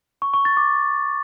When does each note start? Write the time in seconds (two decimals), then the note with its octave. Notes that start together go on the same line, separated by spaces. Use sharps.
0.22 C#6
0.34 C#6
0.45 A6
0.57 D6